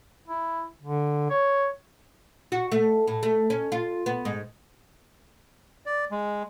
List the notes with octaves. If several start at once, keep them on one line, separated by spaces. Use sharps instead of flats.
E4
D3
C#5
F#4
A3
A2
A3
C#4
F4
B3
G#2
D5
G#3